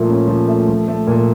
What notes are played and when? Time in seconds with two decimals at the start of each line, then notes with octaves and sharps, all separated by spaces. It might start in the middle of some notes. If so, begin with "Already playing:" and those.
Already playing: A#2 F3 A3
0.08 C#4
0.28 F3
0.48 A3
0.68 F3
0.88 A3
1.07 A#2